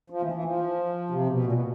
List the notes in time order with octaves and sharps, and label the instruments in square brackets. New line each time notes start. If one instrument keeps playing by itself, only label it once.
[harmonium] F3
E3
E3
F3
C3
B2
A#2
B2